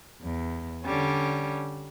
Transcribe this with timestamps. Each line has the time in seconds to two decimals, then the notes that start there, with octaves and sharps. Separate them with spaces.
0.22 E2
0.84 D3 G3 C#4